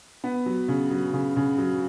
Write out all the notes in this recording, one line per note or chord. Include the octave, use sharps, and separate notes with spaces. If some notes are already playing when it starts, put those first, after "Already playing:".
B3
F#3
C#3
F#3
C#3
C#3
F#3